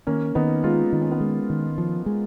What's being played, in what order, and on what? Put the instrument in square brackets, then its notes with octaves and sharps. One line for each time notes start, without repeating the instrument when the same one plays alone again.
[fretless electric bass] D#3 [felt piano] A#3 C#4
[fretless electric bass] D#3 [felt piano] B3 D#4
[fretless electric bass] G#3 [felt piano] C#4 F4
[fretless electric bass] D#3 [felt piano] D#4
[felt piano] C#4
B3 D#4
[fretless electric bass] G#3
D#3
F3
G#3